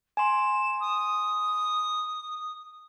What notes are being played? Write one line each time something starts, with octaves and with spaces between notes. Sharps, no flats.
G#5 C6 E7
D#6